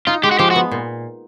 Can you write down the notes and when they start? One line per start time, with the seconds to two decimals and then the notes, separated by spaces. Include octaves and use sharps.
0.07 D#4 F4
0.23 G#3 G4
0.31 F#4
0.39 F3 G4
0.51 F#4
0.56 B3
0.71 A#2